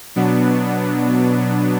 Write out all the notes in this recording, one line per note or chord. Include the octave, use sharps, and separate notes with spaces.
B2 F#3 B3 D4